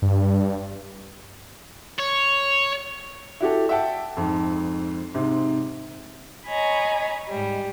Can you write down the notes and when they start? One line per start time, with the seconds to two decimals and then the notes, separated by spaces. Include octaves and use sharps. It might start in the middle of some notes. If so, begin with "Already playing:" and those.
0.02 G2
1.99 C#5
3.40 E4 F#4 G4 A4
3.69 E5 F#5 G5 A5
4.17 F2 G#2
5.14 G#2 C3
6.47 C#5 D#5 G#5 A#5 B5
7.28 G#2 G3